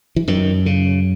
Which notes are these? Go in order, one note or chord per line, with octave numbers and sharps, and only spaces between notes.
E3
F#2 D#3
C#3